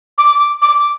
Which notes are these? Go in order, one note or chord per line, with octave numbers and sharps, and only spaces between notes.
D6
D6